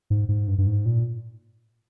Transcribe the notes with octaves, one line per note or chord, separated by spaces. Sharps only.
G#2
G#2
G2
G2
G#2
A#2